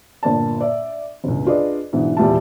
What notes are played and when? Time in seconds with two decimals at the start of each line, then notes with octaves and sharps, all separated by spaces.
0.23 G1 A#2 A#3 D5 A5
0.61 D5 E5
1.24 G1 C#2
1.46 D4 F4 G#4 B4 D5 D#5
1.93 G#2 B2 D3 E3
2.17 D#1 E2 G3 F4 E5 A5